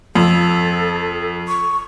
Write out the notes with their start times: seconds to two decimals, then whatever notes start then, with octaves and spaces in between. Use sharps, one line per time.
0.15 F2 A4
1.48 C#6